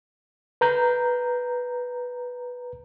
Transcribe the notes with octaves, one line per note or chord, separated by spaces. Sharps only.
B4 A#5 G6